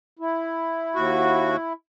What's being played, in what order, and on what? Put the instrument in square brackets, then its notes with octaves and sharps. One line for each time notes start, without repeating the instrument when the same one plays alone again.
[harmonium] E4
[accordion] D#2 F#4